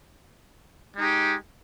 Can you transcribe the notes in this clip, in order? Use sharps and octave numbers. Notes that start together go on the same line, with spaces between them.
G#3 D#4 G4